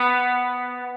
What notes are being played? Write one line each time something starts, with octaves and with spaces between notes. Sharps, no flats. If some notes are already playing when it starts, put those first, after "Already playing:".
Already playing: B3